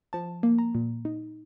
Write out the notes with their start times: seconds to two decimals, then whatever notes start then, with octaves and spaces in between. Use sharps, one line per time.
0.13 F3 A5
0.43 A#3
0.59 A#5
0.75 A#2
1.05 D#4